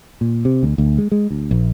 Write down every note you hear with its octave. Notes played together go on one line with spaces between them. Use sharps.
A#2
C3
D2
D2
G#3
G#3
D2
A#1